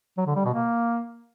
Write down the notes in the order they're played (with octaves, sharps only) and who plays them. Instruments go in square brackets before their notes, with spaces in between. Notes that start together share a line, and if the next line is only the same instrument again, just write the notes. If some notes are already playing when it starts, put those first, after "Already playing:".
[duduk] F#3
D3
G3
B2
A#3